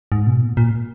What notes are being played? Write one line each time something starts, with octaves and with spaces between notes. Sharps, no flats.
G#2
B2
A#2
A#2